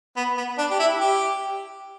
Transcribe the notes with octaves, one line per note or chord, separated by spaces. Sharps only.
B3
B3
D4
G4
E4
G4